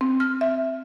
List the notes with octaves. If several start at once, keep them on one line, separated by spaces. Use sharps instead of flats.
C4
F6
E5